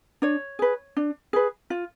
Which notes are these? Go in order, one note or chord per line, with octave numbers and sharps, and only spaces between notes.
D4 C#5
G#4 B4
D4
G#4 B4
F4